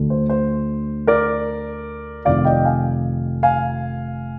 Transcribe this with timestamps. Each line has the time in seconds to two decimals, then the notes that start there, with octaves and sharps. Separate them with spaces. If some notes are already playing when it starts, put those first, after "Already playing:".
Already playing: D2 D3
0.10 C5
0.30 C5
1.07 A#4 D5
2.25 F1 F2 C3 D#3 D5 F5
2.45 D#5 G5
2.65 F5 G#5
3.43 F5 G#5